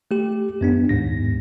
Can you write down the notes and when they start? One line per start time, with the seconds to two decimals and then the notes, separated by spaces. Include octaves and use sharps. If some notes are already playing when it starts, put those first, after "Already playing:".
0.11 A3 G4
0.61 F#2 B3 D4
0.89 D#2 G#2 A#6